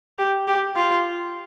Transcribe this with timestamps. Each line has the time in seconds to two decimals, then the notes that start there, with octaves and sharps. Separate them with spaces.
0.19 G4
0.48 G4
0.76 F4